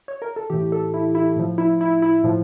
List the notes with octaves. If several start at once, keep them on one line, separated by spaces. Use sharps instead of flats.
C#5
A#4
A4
A2 E3 G4
A4
E4
E4
A2 F3
E4
E4
E4
A2 F3